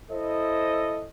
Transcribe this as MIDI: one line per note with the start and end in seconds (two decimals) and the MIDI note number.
0.11 1.08 64
0.11 1.08 69
0.11 1.08 72
0.11 1.08 75